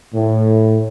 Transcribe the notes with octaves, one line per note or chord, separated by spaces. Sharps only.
A2